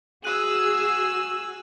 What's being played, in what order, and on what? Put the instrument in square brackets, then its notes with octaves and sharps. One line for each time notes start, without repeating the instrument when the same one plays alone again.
[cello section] F#4 [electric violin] G#4 [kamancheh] G#5 E6 [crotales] F#6 D#7 F#7